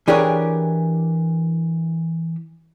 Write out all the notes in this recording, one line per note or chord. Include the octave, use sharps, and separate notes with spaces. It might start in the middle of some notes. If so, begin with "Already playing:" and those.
E3 D4 G4 G#4 A#4 C#5